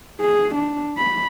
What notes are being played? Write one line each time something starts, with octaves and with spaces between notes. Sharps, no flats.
G#4
D4
B5